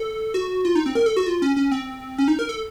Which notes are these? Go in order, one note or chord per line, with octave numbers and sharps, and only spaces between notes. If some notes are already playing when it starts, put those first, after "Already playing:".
Already playing: A4
F#4
F4
D#4
C4
A#4
A4
F#4
F4
C#4
C#4
C4
C#4
D#4
A#4
A4